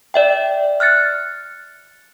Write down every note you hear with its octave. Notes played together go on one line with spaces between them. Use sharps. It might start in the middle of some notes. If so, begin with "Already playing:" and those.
D5 E5 G5
F6 F#6 A6 C#7